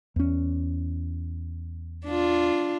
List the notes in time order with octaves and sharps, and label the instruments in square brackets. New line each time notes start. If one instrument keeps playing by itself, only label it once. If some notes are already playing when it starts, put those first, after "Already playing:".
[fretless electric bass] E2 C#4
[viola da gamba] D4 F4